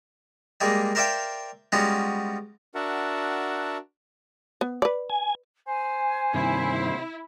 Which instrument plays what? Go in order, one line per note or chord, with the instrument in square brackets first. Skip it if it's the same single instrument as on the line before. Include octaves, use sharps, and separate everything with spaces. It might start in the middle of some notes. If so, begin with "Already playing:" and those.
[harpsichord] G3 G#3 A#3 G#4
A#4 C5 D5 E5 F5 G5
G3 G#3 B3 C#4 F4 F#4
[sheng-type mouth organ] D4 F#4 A#4 E5 F#5 A5
[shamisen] B3
B4 D5
[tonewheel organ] G#5
[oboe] C5 [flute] G#5
[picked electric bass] G2 C3 D#3 [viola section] E4 [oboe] C5